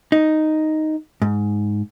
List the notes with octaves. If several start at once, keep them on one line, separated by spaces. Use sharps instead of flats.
D#4
G#2